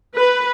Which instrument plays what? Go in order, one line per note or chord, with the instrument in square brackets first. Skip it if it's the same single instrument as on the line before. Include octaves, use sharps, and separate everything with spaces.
[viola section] B4